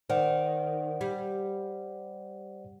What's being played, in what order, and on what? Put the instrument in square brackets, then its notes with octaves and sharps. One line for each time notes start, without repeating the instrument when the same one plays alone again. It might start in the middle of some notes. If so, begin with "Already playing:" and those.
[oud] D#3 [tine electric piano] C5 D5 F#5
[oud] G3